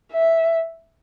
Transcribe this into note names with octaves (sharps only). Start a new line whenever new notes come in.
E5